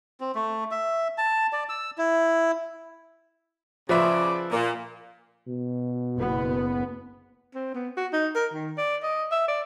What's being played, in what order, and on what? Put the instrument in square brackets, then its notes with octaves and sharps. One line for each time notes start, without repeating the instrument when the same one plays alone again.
[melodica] C4
A3
E5
A5
D5
E6
E4
[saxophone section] C#3 D5 [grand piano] F3 B4 E5
[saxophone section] A#2
[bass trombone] B2
[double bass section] F#1 B3
[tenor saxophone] C4
B3
F#4
D#4
A#4
D#3
D5
D#5
E5
D5